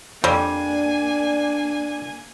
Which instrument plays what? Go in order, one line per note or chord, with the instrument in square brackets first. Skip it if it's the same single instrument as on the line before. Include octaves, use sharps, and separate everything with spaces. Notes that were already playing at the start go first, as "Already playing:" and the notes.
[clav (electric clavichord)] F2 C4 [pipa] G3 [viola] A#3 G#5 [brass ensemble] D4